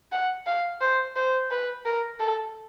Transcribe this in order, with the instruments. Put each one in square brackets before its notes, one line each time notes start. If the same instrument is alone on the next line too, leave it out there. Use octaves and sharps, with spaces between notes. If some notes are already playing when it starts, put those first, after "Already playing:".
[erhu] F#5
F5
C5
C5
B4
A#4
A4